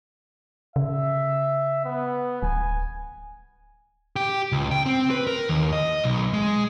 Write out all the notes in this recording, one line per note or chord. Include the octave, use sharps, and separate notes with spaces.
C#3 E5
B3
D1 G#5
G4
C#2
G5
C4
B4
A#4
D#2
D#5
B1
G#3